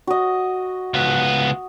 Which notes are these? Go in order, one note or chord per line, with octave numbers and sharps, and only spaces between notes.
F#4 D#5
C#2 B3